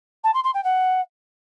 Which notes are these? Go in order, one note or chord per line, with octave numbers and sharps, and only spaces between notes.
A5
C6
C6
G5
F#5